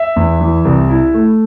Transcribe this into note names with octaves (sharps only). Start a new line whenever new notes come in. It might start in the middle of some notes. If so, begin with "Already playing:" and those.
Already playing: E5
E2
E3
C2
E4
A3